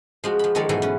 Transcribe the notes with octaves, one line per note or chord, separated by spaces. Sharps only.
F3 G#3 F#4
F3 B5
D#3 F3 G#3 A4 C#5 D5
G#2 B2 E3 F#3 G#4 A4
C#4 B4